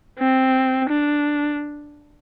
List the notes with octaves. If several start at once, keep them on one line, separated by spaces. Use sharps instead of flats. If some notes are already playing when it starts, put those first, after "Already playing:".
C4
D4